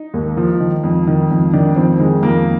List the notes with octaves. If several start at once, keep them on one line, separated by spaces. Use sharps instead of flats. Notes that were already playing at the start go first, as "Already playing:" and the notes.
Already playing: D#4
D#2
F3
D#3
F2
D#3
F2
D#3 D4
F2 C4
D#3 G#3
F2 A#3